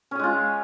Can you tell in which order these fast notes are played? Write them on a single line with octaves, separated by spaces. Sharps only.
C#4 G#4 G#3 F4